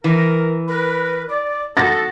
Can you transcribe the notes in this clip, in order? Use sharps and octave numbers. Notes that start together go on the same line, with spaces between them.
E3 A#4
A#4 B4
D5
B3 F#4 A4 A6 A#6